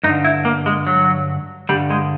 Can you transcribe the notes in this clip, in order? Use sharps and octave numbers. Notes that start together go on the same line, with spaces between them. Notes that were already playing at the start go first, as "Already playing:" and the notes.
G2 D#4
D3
E4
A#3
G#3
F#3
G2 D3 G3
G#3